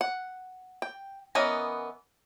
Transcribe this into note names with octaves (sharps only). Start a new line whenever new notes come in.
F#5
G5
E3 B3 C#4 A#4 D#5